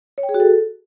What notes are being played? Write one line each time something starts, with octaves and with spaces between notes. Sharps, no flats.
C#5
G5
G#4
F#4
A4